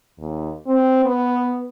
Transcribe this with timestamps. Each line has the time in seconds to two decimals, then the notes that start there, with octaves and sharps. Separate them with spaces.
0.18 D#2
0.67 C4
1.05 B3